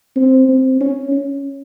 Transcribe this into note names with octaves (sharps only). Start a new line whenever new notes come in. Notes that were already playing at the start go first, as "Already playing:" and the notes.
C4
C4
C#4
C#4